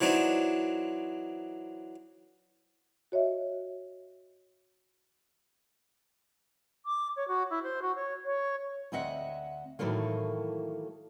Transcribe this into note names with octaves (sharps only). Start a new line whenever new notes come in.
E3 F#3 C4 D4 D#4
F#4 C#5 D#5 E5
D6
C#5
F#4
E4
C5
F#4
C#5
C#5
D2 C4 D#5 E5 F#5
A2 D#3 E3 F#3 A3 A#3